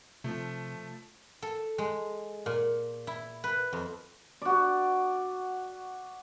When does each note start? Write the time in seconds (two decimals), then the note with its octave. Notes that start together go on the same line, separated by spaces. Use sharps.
0.24 C3 F3 A3
1.42 A4
1.78 G#3
2.46 A#2
3.07 E4
3.44 B4
3.73 F2
4.42 F#4 D5